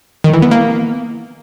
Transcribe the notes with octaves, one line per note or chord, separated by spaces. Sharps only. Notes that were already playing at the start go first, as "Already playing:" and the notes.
D#3
E3
B3
A#3